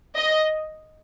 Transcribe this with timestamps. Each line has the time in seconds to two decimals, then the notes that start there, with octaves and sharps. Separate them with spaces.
0.16 D#5